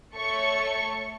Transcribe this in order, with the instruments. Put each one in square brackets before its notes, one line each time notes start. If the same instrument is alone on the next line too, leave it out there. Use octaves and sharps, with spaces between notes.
[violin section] A3 A4 C#5 C#6 C#7